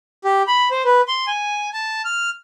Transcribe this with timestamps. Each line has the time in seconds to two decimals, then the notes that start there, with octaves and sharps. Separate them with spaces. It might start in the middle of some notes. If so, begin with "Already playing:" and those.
0.25 G4
0.48 B5
0.71 C5
0.85 B4
1.08 C6
1.27 G#5
1.73 A5
2.05 F6